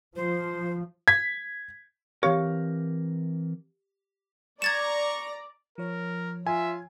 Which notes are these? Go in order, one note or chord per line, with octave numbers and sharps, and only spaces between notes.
F3 C5
G#6 B6
E3 C4 G4 A#4 C#5 F5
D5 A#5 C#6 G#6 A6 E7
F3 A#4 C#5
F4 E5 G#5